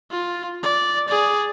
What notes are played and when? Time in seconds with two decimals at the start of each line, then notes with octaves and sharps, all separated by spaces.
0.11 F4
0.63 D5
1.09 G#4 D5